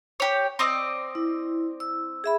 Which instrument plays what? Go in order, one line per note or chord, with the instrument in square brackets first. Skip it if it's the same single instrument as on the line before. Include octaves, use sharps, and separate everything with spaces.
[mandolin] G4 C#5
C4 D5 D#5
[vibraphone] E4
E6
G#4 E5 B5